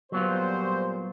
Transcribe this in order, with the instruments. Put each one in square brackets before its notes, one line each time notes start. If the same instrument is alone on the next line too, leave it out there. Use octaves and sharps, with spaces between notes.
[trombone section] A#2 G3 C5 [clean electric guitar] F#3 B3 F4